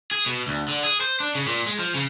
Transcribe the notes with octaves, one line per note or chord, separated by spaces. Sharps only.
G#4
B2
D2
D3
G#4
C5
D4
C#3
A#2
G#3
F3
C#3